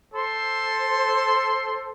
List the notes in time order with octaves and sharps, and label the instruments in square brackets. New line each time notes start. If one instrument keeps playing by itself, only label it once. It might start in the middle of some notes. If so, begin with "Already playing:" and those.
[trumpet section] A4 C5 C6